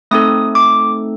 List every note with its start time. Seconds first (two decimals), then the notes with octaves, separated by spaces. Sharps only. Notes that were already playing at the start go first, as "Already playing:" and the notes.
0.11 A3 C4 D#4 A4 D#6
0.55 D6